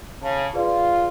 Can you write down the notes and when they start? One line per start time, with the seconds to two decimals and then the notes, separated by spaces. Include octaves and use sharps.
0.23 C#3 A5
0.54 F4 G#4 B4 D5